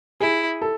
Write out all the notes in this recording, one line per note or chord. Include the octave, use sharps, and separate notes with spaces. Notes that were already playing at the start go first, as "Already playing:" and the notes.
E4 G#4
A4